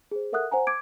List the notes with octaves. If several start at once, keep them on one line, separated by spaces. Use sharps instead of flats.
G#4 C5
A4 A#4 E5 F#5 D#6 F#6
C5 F#5 G#5 A#5
D6 G#6 D7